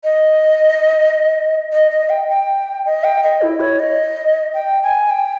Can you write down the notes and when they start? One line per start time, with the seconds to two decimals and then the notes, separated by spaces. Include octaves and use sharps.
0.04 D#5
1.72 D#5
1.91 D#5
2.10 G5
2.29 G5
2.85 D#5
3.04 G5
3.23 D#5
3.42 E4
3.60 C#5
3.79 D#5
4.54 G5
4.83 G#5
5.11 G5